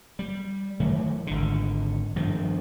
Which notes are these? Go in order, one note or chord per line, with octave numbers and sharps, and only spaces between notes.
G3
D#3 E3 F#3 A3
G#1 D3
G2 D#3 F3